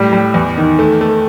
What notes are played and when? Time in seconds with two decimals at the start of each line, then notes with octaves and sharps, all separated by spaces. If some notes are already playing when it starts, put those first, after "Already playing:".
Already playing: A2 G3
0.13 G3
0.34 E2
0.57 D#3
0.79 A3
1.01 A3